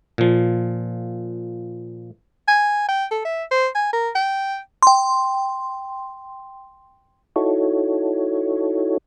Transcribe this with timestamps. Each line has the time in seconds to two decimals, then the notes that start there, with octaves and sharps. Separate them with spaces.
0.18 A#2 F3
2.48 G#5
2.88 G5
3.11 A4
3.25 E5
3.51 C5
3.75 G#5
3.93 A#4
4.15 G5
4.83 G5 C6
7.36 D#4 E4 F#4 A4 C#5